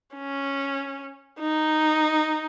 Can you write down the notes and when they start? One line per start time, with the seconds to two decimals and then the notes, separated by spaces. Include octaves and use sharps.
0.15 C#4
1.40 D#4